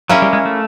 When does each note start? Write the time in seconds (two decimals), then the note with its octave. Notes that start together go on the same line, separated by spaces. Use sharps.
0.09 F#3 A#3 C#4 E4 G#4
0.22 G3
0.33 G#3
0.45 A3